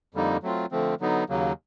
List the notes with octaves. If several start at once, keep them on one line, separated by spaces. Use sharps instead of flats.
F2 D3 G3 A#3 D#4
F#3 A3 C4 F4
D3 F3 A3 C4
D3 F#3 B3 D#4
D#2 C#3 F#3 A#3